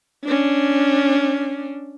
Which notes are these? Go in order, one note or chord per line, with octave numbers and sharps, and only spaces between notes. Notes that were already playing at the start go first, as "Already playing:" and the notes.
C#4 D4